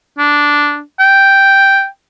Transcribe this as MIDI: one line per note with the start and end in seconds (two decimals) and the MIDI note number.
0.18 0.81 62
0.99 1.86 79